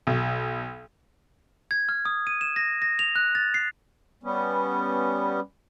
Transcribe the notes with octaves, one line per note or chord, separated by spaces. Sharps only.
B1
G#6
F6
D#6
D#7
E7
A#6
A#6
F7
F#6
A6
C7
G3 B3 C#4